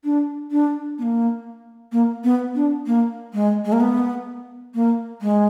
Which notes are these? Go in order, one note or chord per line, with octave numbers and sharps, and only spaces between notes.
D4
D4
B3
A#3
A#3
B3
D4
A#3
G#3
G#3
A#3
B3
A#3
G#3